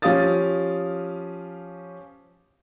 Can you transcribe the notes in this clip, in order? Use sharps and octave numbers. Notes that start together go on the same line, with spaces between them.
F3 C#4 G4 F5 D#6 A6